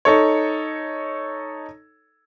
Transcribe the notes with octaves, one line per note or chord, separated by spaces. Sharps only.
D#4 A4 C#5